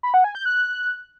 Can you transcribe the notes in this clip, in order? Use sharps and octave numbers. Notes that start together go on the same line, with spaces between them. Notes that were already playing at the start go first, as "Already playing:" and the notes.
B5
F#5
G#5
G6
F#6